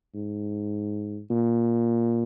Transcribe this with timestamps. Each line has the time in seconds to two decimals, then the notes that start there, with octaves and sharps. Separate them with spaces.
0.15 G#2
1.30 A#2